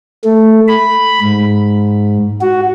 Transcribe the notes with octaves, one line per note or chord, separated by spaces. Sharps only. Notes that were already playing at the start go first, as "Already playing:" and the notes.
A3
B5
G#2
F#4